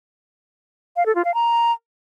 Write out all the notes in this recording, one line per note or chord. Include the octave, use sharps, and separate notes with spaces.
F5
A4
F4
F5
A#5